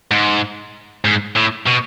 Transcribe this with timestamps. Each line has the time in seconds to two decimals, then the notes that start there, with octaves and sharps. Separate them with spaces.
0.11 G#2
1.05 G#2
1.36 A2
1.67 B2